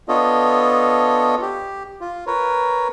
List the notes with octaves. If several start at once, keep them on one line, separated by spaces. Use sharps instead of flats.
B3 D4 F4 A4 C#5 D#5
G4
F4
A#4 B4 C#5